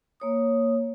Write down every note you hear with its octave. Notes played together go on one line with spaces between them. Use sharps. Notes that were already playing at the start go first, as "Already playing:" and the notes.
A#3 C#5 D#6